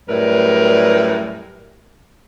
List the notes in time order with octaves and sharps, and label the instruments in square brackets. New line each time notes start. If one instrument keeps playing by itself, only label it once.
[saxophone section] F#2 A2 G3 A#4 B4 D5